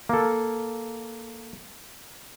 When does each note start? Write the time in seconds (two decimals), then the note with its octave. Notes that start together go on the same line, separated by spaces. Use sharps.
0.09 A#3 A4